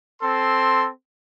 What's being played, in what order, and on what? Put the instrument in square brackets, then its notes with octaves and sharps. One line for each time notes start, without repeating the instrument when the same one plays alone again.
[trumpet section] C4 A4 C6